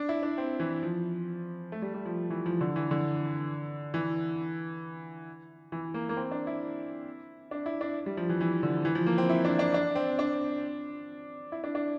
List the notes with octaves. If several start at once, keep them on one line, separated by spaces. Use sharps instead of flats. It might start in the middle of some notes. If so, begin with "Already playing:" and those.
Already playing: D4
E4
D4
C4
E3
F3
A3
G3
G3
F3
E3
F3
D3
E3
D3
E3
E3
A#3
A#3
C4
D4
E4
D4
E4
D4
G3
F3
E3
E3
D3
E3
F3
A#3
C4
E4
D4
D4
D4
C4
D4
E4
D4
D4